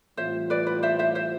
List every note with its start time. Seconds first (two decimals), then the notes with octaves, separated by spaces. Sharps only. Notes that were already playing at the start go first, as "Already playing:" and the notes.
0.17 A2 E3 G3 C4 F4 C5 E5
0.50 B4 D5
0.67 B4 D5
0.83 C5 E5
0.99 C5 E5
1.15 C5 E5